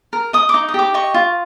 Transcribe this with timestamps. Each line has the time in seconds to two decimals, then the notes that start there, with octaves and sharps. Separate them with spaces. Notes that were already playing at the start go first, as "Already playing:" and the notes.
0.13 A#4
0.33 D#5 D#6
0.49 D#4 D6
0.68 D#6
0.74 G4 D6
0.94 D#5 C#6
1.14 F4